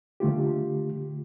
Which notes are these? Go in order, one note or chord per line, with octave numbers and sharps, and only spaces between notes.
D3 A3 F4 G4